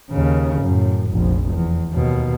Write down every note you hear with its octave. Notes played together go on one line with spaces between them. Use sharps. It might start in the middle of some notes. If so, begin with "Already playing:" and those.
D#2 C#3
F#2 A2
F1 A#1
E2
D#2 B2